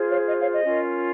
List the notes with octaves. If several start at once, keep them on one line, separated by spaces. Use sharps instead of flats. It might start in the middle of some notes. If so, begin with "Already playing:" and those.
Already playing: F4 G#4 C5
C#5 F5
D#5
C#5 F5
D#5
C#4 F4 A#4